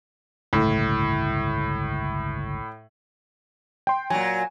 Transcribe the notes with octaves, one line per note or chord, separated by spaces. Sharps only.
G1 C#2 A2
G5 C6
A#2 F#3 G#5